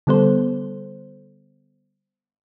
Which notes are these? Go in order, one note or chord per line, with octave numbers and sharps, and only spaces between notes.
D3 G3 B3 A4 C5